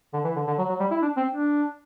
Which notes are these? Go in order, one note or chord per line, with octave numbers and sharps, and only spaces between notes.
D3
E3
D3
D3
F#3
F#3
G3
E4
D4
C4
D4